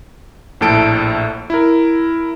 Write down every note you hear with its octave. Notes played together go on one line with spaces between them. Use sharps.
A#1 A2 A4 D7
E4 A#4